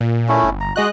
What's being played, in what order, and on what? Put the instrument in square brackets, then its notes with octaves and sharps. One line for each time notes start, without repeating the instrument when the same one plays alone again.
[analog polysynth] A#2
[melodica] A3 C#4 E4
[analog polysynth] G1
[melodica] A#5
[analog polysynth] G#3 D#5 F#6 [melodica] F#4